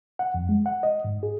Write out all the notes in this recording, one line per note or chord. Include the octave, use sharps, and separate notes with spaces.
F#5
F2
G#3
F#5
D#5
G#2
G#4